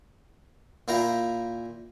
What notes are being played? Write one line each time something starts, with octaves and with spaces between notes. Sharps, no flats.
A#2 E4 F5 G5 A#5